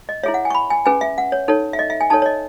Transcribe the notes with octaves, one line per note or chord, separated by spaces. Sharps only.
D#5
E4 G#4 C#5 E5
F#5
G#5
C#6
B5
G#5
C#4 G#4 B4 G#5
E5
F#5
C#5
D#4 A4 C#5
E5
D#5
E5
G#5
D#4 A4 C#5 A5
C#5
D#5